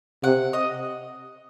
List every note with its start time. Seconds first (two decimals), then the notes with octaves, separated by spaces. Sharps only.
0.24 C3 F#5
0.53 D#5